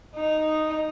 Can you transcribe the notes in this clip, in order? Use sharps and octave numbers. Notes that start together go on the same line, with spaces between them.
D#4